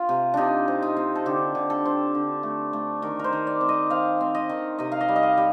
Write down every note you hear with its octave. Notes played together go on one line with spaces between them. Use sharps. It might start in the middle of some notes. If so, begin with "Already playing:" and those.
Already playing: F4
C3
C3 D4 D#4
C4
D#4
C4
A4
D3 G4
D3
A4
C4
D3
A3
A3
D#3 A#4
A#4 C5
D#3
D5
C4
D#5
C4 F5
C4
D#5
D#3
C3 D#5
F5
D#5
G3
D#5
F5
G3